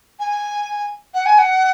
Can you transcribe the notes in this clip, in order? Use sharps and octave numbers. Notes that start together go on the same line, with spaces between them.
G#5
F#5
G#5
F#5